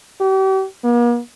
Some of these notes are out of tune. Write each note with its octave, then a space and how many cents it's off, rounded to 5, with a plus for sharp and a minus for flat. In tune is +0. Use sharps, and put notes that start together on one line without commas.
G4 -40
A#3 +45